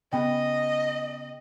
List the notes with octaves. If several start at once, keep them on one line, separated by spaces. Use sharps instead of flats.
C#3 B3 D#5 G5 B5